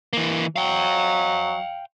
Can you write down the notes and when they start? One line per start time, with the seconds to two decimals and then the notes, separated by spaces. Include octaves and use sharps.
0.13 E3 A#3
0.56 F#3 F5 G5